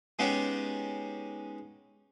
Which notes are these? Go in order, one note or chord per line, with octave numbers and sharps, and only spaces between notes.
G#3 B3 C#4 D#4 F#4 G4